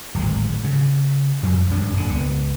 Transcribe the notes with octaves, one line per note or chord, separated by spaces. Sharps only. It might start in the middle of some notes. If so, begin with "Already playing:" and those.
D1 G#1 G#3
C#3
F2
G#1 G2 C#4
D#1 D3
C#2 B3